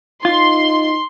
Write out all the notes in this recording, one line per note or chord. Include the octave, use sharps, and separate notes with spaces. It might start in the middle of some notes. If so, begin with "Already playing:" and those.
D#4 F4 C6